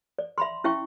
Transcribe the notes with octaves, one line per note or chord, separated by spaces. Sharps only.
D5
E5 B5 C6
C#4 E4 E5 G5 C#6